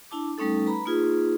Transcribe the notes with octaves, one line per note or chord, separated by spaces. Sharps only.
D4 E4 A5 D6
G3 A3 C#4 D#4 A4
B4 A#5 B5
A#3 D#4 F4 G#4 B4